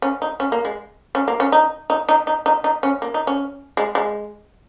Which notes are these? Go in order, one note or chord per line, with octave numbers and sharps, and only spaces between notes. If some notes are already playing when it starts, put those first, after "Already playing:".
C#4
D#4
C#4
A#3
G#3
C#4
A#3
C#4
D#4
D#4
D#4
D#4
D#4
D#4
C#4
A#3
D#4
C#4
G#3
G#3